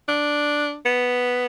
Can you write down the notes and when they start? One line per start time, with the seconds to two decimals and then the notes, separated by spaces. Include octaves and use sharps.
0.08 D4
0.85 B3